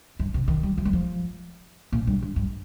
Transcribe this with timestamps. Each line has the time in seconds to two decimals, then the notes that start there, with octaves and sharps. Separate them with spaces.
0.19 G2
0.34 C3
0.48 D#3
0.63 G3
0.78 F3
0.85 G3
0.93 F3
1.92 A#2
2.07 G2
2.22 G2
2.36 G2